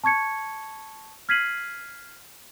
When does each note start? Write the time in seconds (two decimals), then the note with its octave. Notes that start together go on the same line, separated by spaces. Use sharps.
0.04 A5 C#6 G#6 C#7
1.29 F6 G#6 B6 C7 D#7 F#7